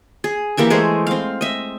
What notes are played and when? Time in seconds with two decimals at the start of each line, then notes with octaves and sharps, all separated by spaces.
0.24 G#4
0.57 E3 A#3 G4 E5
0.70 G#3 A3 G#4 C5
1.07 C4 F5
1.41 D#5 E5